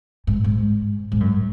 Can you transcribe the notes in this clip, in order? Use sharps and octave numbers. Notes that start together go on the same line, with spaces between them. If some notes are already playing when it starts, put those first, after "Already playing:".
G#2
G#2
G#2
F#2